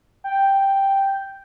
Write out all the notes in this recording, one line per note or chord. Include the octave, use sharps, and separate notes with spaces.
G5